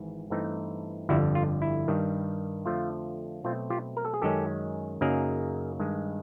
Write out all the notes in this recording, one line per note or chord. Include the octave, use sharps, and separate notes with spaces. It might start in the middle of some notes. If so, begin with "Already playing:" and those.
Already playing: G#1 G#2 E3
G2 E3 A3 C4 D#4
G1 F2 D3 G3 E4 F#4
F4
E4
G2 D#3 G3
F2 D3 F3 A3 F4
B2 F#3 A3 C4 F4
F4 G4
A#4
A4
G#4
F#2 D#3 G#3 C#4 G4 A4
F#2 C#3 F#3 A#3 D#4 G#4 A#4
G2 D#3 G#3